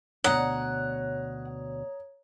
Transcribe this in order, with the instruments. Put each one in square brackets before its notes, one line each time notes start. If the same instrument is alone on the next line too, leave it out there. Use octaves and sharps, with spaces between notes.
[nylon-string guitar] D2 B2 D5 [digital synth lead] C#5 [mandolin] F#5 [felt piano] A#5 D#6